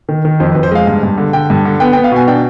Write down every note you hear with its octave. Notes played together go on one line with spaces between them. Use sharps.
D#3
D#3
F2 C5
B4
F2
C5
G#3 F5
G2
G2
D3
D3 G5
G2
D3
B3 G5
G5
B3
F5
B2 G#5
D4 G5